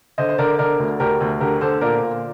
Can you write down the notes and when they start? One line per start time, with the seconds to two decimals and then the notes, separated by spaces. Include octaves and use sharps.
0.18 D3 C5 D#5
0.29 C5
0.38 D3 A#4 D5
0.59 D3 A#4 D5
0.79 D2
1.00 D2 G4 A#4
1.21 D2
1.41 D3 G4 A#4
1.61 D3 A4 C5
1.81 A#2 A#4 D5
2.02 A#2